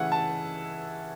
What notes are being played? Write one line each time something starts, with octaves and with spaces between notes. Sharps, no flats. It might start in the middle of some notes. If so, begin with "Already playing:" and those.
Already playing: C#3 E3 A3 C#4 E4 F#5
A5